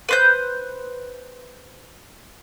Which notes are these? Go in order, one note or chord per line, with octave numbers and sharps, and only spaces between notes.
B4 C5 G6